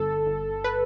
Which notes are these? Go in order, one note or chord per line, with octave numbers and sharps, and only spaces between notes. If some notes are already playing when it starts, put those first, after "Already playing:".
Already playing: G1 A4
G1
B4